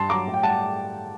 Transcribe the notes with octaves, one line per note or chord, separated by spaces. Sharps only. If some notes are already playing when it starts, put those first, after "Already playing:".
Already playing: G2 A5 C6
F#3 A#5 D6
A2
G5
G3 F#5 A5